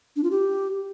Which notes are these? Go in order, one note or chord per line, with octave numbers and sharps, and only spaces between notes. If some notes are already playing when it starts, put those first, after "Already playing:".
D4
F4
G4